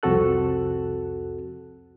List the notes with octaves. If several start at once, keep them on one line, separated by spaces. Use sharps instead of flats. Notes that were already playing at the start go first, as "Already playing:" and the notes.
C2 F2 C4 F#4 A4 F#6